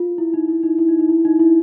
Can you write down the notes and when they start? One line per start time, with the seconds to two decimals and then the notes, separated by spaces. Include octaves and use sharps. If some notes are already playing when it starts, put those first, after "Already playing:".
Already playing: F4
0.18 E4
0.34 D#4
0.49 E4
0.63 D#4
0.79 E4
0.89 D#4
0.99 D#4
1.09 E4
1.25 D#4
1.40 E4